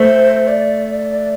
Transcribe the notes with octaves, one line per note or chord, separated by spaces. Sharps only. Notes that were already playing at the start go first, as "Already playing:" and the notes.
Already playing: A3 C5
D5